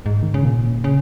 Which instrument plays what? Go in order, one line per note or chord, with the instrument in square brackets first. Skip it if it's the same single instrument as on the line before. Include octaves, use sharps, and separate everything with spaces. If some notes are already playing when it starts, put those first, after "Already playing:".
[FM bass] G#2
D#3
C#3
A#2
C#3